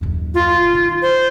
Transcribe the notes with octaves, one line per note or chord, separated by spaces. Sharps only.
D#1 F#2
F4
D#3
C5